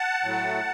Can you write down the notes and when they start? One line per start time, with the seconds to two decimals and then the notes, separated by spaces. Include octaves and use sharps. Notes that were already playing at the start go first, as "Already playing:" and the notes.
Already playing: F#5 A5
0.23 A2 F#3 A3